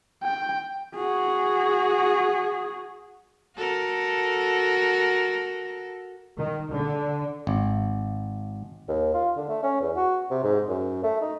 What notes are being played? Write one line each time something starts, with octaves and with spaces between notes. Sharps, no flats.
G5
F#4 G#4
F#4 A4 A#4
D#3
D3
G#1
D#2
F4
D3
A3
C#4
E2
F#4
C3
G#2
F#2
A3
D#4